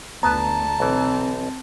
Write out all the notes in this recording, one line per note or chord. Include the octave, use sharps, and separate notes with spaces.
D2 B3 B4 A5 A#5
B1 E3 C4